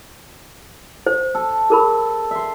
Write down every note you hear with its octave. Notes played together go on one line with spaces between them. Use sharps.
C5
A4
G#4 A#4 B5
E5 C6